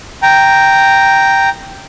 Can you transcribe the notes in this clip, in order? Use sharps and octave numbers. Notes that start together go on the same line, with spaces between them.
G5 A#5